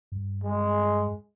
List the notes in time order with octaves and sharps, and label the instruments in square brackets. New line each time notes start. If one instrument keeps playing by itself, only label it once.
[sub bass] G2
[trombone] G#3